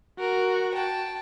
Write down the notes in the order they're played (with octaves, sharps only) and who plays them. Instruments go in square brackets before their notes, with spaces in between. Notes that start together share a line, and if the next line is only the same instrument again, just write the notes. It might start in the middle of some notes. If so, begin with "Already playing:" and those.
[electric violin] F#4 [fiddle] A#4
[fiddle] G5 A5